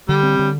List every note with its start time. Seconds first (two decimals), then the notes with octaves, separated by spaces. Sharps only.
0.08 D3 G3
0.23 C4
0.39 D3